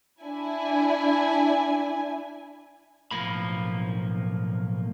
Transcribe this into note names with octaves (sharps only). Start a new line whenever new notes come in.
D4 E4 G#5
B1 A2 F3 A#3 B5